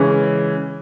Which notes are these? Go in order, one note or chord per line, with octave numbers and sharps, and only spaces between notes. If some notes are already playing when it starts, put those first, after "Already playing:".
Already playing: C#3 E3 G#3 C#4